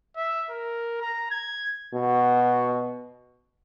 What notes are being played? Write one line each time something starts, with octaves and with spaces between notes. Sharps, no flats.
E5
A#4
A#5
G#6
B2 F#4